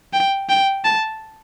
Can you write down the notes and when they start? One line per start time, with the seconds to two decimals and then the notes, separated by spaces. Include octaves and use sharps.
0.13 G5
0.49 G5
0.84 A5